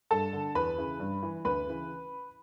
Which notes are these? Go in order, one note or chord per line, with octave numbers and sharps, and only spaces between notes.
G2 A4 A5
D3
E2 B4 B5
C#3 E3
G2
E3
D2 B4 B5
C#3 E3